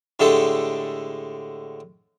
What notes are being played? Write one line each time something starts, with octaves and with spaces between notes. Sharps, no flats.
A2 D3 G#3 A3 G4 A4